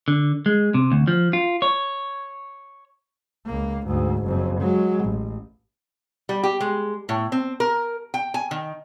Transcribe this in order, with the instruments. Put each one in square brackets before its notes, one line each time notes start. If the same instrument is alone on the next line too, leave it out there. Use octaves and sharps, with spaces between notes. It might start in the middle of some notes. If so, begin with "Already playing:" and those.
[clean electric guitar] D3
G#3
C3
D2
F3
F4
C#5
[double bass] C#2 A#3
D2 G#2
F#1 F2
F#3 G#3
A1
[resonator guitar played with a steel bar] G3
G4
G#3
A2
C4
A#4
G5
G#5
D#3